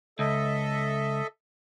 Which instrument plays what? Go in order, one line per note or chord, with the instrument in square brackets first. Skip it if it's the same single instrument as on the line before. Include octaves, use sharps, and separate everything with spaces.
[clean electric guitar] C#2 [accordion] A4 D#5 E5